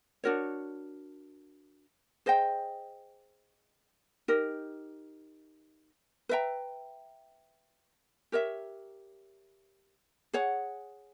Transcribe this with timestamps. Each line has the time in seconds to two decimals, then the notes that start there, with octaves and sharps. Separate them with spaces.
0.24 D4 F#4 A#4 C#5
2.26 G#4 C5 D#5 G5
4.28 D#4 G4 A#4
6.29 B4 E5 G5 A#5
8.32 G4 A#4 C#5 E5
10.33 G#4 C#5 F#5